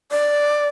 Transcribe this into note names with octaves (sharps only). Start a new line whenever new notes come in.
D5